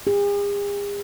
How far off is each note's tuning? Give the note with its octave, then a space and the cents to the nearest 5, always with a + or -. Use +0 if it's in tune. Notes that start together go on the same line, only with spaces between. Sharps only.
G#4 -45